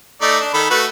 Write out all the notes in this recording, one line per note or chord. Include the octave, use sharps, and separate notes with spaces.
A3 D#4 D5
D4
D#3 A4 B5
A3 F#4 B4